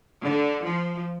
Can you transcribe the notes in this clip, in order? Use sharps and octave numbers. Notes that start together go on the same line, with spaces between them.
D3
F3